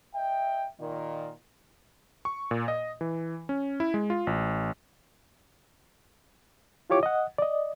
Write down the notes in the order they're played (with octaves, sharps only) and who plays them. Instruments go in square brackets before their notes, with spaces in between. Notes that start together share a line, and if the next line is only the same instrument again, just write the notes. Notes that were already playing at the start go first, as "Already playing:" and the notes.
[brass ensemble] D#5 E5 G5
A#2 D#3
[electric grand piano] C#6
A#2
D#5
E3
C#4
E4
G#3
F4
A1
[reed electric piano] E4 F4 G4 C#5 D6
D#5 F#5
D5 D#5